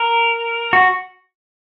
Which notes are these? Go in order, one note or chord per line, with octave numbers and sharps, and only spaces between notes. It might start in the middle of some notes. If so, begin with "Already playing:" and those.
Already playing: A#4
F#4